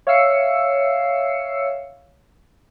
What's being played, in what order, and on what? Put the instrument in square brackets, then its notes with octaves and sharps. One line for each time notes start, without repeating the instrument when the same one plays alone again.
[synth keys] C#5 E5 F5 E6 C7 C#7